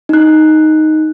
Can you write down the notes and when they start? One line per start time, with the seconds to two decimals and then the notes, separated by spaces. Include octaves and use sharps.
0.09 D#4 F#6